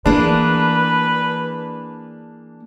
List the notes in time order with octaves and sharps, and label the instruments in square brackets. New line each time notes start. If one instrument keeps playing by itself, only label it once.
[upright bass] E3 [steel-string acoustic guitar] A#3 G#4 [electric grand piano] D4 [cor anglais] B4